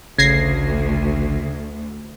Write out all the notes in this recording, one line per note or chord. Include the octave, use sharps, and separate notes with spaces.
A1 D2 C#3 G#6 A#6 C7